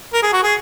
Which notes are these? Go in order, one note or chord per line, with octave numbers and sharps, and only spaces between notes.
A#4
G#4
F#4
G#4